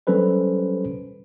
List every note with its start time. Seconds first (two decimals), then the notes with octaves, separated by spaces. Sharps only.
0.07 F#3 G3 C#4 A4 B4 C5